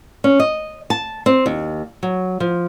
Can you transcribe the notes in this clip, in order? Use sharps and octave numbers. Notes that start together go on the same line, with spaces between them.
C#4
D#5
A5
C4
D#2
F#3
F3